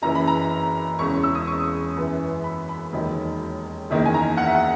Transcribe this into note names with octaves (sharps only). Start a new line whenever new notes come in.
F#1 F#2 E3 A#5
B5
A#5
E1 E2 C#3 C#6
E6
D#6
C#6
F#2 E3 B3
B5
B5
E1 D#2 D#3 F#3
F#1 E2 D#3 A#3
G#5
A#5
F#5
E5
F#5